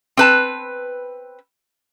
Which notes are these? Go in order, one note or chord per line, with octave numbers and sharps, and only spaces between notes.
C4 B4 A5